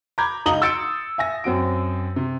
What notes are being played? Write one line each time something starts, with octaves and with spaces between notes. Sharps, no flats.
A#5 B5 D6 G6 G#6
C#2 D#4 A#5 D#6 F#7 G7
C6 E6 G6 A6 C#7 D7
E5 G#5 A#6
F#2 C4 F#4 D7
C3